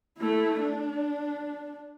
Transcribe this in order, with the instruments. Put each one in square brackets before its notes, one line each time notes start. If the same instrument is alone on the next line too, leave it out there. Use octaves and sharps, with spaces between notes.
[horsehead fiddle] A3 E4
D4